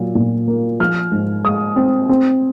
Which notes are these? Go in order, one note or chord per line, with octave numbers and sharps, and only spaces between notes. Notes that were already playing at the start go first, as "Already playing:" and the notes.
Already playing: A#2 F#3
A#2
A#3
F3 F6
G#2
G#3 D#6
C4
C4